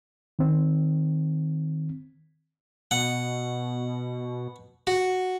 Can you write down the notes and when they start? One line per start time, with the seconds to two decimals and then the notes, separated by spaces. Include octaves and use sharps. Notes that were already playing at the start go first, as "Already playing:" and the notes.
0.39 D#3 C4
2.91 B2 F#5
4.87 F#4